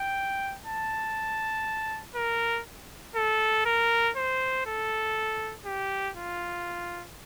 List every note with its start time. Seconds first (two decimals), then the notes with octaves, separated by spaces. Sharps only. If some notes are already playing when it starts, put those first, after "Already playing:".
Already playing: G5
0.67 A5
2.15 A#4
3.16 A4
3.65 A#4
4.16 C5
4.66 A4
5.65 G4
6.16 F4